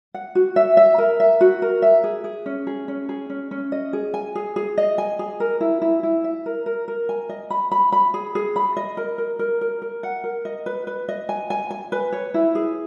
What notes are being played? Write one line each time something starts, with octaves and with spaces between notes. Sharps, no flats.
F#5
F#4
E5
E5
A#4
E5
F#4
A#4
E5
G#4
G#4
C#4
G#4
C#4
G#4
C#4
C#4
D#5
G#4
G#5
G#4
G#4
D#5
G#5
G#4
A#4
E4
E4
E4
E5
A#4
A#4
A#4
G#5
D#5
B5
B5
B5
G#4
G#4
B5
D#5
A#4
A#4
A#4
A#4
A#4
F#5
A#4
D#5
B4
B4
D#5
G#5
G#5
G#5
B4
C#5
E4
G#4